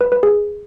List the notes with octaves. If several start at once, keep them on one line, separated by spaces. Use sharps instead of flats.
B4
B4
G#4